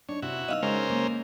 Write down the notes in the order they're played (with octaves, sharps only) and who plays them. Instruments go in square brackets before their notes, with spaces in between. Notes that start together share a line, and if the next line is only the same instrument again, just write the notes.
[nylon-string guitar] D4 D#4 [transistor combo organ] C#5
[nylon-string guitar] C3 [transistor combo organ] E4 F#4
[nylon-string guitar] B3 D#4 [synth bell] D#5 F5 E6
[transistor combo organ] C#3 A#4 C5 [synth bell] G#3
[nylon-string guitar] A#3